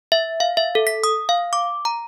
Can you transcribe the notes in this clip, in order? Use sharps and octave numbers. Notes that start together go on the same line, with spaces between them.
E5
F5
E5
A4
B6
D#6
F5
D6
A#5